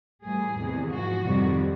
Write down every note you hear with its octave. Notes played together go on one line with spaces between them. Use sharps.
A2 E3 G3 G#4
E2 C3 D#3
G#2 F3 F#4
F2 C3 D#3 G3